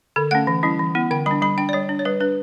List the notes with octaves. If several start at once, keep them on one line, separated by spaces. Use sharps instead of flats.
D3 A4
A3 C#4 F#5
E3
G3 C#4 E4
E3
B3 E4
D3 G5
G3 D4 B5
G3 B5
D4 G5
D5
G3 C#5
D4
C#5
G3 B4
D4 B4